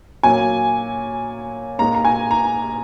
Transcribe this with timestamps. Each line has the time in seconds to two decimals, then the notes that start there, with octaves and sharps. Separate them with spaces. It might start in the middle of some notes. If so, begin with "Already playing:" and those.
0.23 A#2 F#3 G#5
1.79 A#2 G#3 A#5
1.95 A#5
2.05 G#5
2.31 A#5